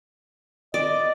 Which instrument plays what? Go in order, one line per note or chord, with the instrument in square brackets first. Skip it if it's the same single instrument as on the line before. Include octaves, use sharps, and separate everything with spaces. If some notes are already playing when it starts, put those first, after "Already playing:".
[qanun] D5 [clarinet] D#5